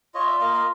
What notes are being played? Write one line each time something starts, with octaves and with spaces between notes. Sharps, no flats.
F4 C#5 D#5
D5 E5
A#3 D#5 F5
D#5 F5